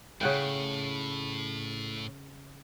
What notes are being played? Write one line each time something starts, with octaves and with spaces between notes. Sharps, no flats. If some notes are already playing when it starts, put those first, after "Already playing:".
A2 C#3 F#5 G5